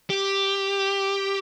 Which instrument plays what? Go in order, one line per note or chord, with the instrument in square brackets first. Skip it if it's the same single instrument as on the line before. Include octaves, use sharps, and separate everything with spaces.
[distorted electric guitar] G4